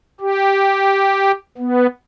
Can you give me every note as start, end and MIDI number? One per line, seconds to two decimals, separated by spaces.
0.20 1.32 67
1.58 1.87 59